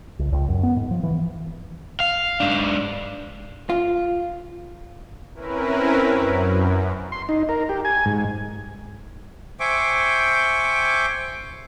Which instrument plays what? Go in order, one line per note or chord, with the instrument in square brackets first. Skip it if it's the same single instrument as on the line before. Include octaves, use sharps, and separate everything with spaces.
[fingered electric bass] C#2
C#2
F#2
B3
G#2
F3
E3
[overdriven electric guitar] F5
G#2 D4
[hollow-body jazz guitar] F4
[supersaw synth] C4 C#4 E4 A#4 B4
F#2
[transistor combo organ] C6
D#4
A#4
G4
G#5
G#2
[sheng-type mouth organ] C5 E5 G5 G#5 C#6 D6